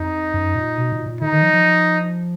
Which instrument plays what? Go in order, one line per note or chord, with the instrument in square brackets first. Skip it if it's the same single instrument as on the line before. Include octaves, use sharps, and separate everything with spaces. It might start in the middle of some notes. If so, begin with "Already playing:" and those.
Already playing: [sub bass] F2 [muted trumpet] D#4
[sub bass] F#2
A#2
B2
A#2
A#2
[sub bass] D3 [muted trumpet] D#4
[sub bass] D#3
F3
F3